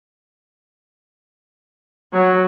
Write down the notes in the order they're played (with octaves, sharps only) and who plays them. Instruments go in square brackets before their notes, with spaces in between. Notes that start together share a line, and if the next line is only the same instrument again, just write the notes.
[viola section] F#3